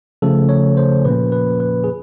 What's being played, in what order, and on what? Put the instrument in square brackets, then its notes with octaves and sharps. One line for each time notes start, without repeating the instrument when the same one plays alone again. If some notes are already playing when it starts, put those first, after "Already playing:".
[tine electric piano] C#3 F3 A3 A4
C#5
C5
A#2 F3 A#3 C#4 B4
B4
B4
G#4